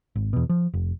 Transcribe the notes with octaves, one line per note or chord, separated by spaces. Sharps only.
G#1
E2 B2
F3
F1